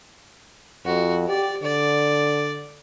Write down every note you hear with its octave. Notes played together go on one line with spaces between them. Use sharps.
F2 F#4
G4 D5
D3 D5